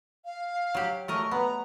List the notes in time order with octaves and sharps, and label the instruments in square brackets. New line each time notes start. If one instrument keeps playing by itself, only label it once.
[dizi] F5
[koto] F#3 G4
[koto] A3 A#4 D#5 [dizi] C#6
[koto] B3 [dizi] A#5